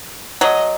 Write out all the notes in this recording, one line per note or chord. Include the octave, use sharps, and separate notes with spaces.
F#3 D#5